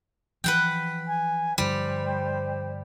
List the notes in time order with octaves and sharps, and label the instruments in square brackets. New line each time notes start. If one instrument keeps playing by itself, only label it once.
[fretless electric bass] E3 F3 [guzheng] B4 F#5 G5
[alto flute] G#5
[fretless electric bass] G2 D3 F3 [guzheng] G3 [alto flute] C5